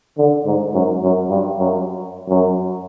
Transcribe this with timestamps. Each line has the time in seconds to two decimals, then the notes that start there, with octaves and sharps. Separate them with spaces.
0.18 D3
0.46 G#2
0.74 F#2
1.03 F#2
1.30 G2
1.59 F#2
2.29 F#2